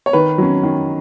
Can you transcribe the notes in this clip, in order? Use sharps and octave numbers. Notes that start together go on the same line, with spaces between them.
C#5
D#3 B4
F#3 C#4
D#3